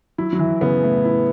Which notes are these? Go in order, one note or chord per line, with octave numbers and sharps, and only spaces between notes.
F#3 E4
F#3
E3
C#3 B3
A2
E4